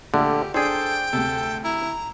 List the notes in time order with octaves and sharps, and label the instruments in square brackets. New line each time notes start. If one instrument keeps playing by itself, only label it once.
[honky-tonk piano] A#1 A3 [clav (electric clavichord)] D3 [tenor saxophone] G4
[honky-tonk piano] D4 [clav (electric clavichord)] G#4 C5 [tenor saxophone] A4 [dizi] G5
[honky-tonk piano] D2 C3 [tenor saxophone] A4
[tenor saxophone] E4 [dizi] A#5